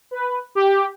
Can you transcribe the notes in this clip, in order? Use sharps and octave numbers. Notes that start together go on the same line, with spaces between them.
B4
G4